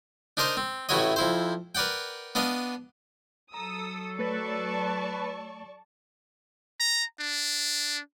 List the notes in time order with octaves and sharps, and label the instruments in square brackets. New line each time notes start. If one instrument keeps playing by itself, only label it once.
[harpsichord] D4 D#4 A#4 C5 D#5
C4
A1 A3 E4 F#4 C#5 D#5
F2 E4 C5
A#4 B4 D5 F#5 G5
B3 D4 D#5 F5
[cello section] F#3 A4 [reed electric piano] A#5 [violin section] D#6 E6
[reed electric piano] A3 C#5 A6 [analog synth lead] B4 [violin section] D5 A5 C#6
[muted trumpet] A#5
D4